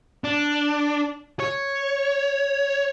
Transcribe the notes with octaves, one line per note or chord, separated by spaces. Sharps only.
D4
C#5